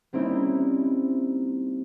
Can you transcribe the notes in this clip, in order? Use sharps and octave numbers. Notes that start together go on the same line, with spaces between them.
G3 A#3 C4 C#4 D#4 E4